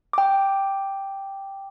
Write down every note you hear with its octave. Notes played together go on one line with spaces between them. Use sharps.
G5 D6